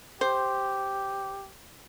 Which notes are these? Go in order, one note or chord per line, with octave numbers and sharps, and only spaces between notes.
G4 C5